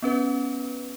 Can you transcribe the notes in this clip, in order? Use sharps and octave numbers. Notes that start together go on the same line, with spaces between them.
B3 C#4 B4